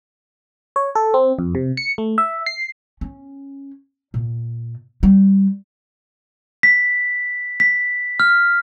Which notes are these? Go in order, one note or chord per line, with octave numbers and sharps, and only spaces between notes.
C#5
A4
C4
F2
C3
C#7
A3
E5
C7
C#4
A#2
G3
B6
B6
F6